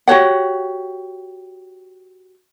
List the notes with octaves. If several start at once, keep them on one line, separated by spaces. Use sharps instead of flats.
F#4 G4 C#5 F#5